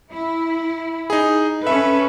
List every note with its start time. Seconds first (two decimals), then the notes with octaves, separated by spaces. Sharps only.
0.13 E4
1.10 D#4 G#4
1.67 C#4 A4 B4 E5